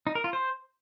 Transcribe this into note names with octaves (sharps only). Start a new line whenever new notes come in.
D#4
A#4
F4
C5